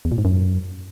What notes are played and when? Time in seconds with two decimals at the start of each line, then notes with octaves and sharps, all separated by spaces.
0.05 E2
0.12 A#2
0.18 G#2
0.25 F#2